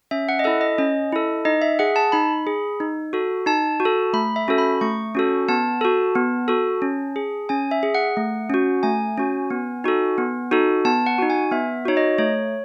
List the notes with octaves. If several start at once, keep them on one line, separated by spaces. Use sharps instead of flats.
C#4 E5
F#5
D#5
E4 A4 E5
D#5
C#4 D#5
E4 A4
D#4 D#5
E5
G#4 F#5
A5
D#4 B5
G#4
D#4
F#4 A4
D#4 A5
F#4
A4
A3 B5
E5
C#4 F#4 A4
B5
A3 C#6
C#4 F#4 A4
B3 A5
F#4 A4
B3
F#4 A4
C#4
G#4
C#4 G#5
E5
G#4
F#5
A3
C#4 F#4
A3 G#5
C#4 F#4
B3
D#4 F#4 A4
B3
D#4 F#4 A4
B3 A5
F#5
D#4 F#4
G#5
B3 E5
D#4 F#4 C#5
D#5
A3 C#5